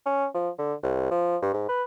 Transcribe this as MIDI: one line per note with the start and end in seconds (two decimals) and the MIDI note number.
0.06 0.27 61
0.34 0.50 53
0.59 0.74 50
0.83 1.09 36
1.11 1.37 53
1.42 1.52 43
1.54 1.69 44
1.69 1.84 71